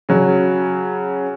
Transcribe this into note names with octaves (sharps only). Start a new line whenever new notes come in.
C#3 F#3